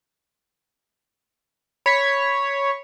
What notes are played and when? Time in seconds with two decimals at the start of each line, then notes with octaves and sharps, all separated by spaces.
1.86 C#5 B5 B6